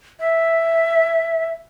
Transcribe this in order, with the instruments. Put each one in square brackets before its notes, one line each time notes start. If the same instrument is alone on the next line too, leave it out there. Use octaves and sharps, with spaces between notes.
[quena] E5